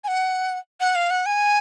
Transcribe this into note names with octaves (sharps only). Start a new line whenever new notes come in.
G#5
F#5
F#5
F5
F#5
G#5